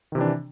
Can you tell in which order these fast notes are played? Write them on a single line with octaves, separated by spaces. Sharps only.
D#3 C3 E3 D4